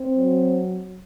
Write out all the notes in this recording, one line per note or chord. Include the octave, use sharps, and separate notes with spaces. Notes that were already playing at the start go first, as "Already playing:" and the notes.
Already playing: C4
F#3